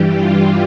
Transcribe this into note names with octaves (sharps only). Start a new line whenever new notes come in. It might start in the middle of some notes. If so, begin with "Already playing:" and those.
Already playing: G2 E3 G3 G4
F4